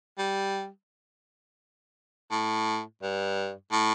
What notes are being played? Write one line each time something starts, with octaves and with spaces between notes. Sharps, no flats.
G3
A2
G2
A2